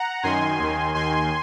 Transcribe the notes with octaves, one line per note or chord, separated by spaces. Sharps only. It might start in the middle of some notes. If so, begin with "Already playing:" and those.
Already playing: F#5 A#5
F#2 D#3 G#5 C6
D#2 D#3
D#2 D#3 G#5 C6